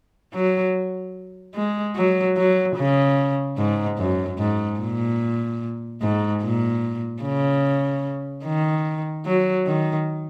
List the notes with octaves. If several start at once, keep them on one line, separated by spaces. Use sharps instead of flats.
F#3
G#3
F#3
F#3
C#3
G#2
F#2
G#2
A#2
G#2
A#2
C#3
D#3
F#3
D#3